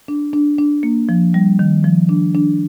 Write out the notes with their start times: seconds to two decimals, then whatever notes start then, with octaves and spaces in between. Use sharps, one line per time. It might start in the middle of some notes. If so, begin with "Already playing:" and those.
0.08 D4
0.33 D4
0.58 D4
0.83 A#3
1.09 F3
1.34 G3
1.59 D#3
1.84 F3
2.09 D4
2.35 D4